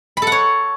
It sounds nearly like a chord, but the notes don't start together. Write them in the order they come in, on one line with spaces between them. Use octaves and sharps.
B5 A4 F#5 C#5